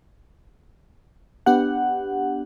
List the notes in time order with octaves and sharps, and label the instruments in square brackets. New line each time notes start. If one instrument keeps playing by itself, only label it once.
[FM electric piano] B3 D4 G4 F#5